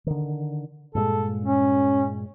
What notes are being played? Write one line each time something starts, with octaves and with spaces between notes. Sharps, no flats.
D3 D#3
G2 A#2 G#3 A4
C#4